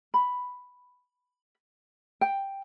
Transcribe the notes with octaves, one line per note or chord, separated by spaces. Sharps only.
B5
G5